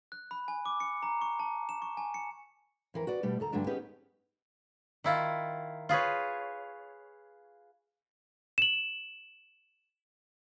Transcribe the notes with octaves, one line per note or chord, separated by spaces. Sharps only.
F#6
B5
G#5
D6
C#7
A#5
C#6
A5
E7
C#6
G#5
C#7
F2 E3 A#4
F#4 B4 D5
B2 G3 A3
D2 A4 A#5
G2 D3 F#3 A3 D4
B3 C#4 D#4 G4 G#4 B4
D#3 E4 F4
F4 G#4 B4 C#5
E7 F#7